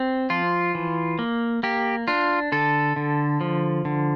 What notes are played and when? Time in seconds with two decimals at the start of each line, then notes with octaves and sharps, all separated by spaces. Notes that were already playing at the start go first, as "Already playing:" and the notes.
Already playing: C4
0.30 F3 F4
0.75 E3
1.19 A#3
1.63 A#3 G4
2.08 D4 F4
2.52 D3 A4
2.96 D3
3.41 F3
3.85 D3